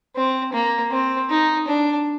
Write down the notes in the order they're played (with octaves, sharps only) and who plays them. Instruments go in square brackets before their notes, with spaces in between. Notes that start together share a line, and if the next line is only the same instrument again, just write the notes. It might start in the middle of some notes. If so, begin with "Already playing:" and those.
[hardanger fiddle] C4
A#3
C4
D#4
D4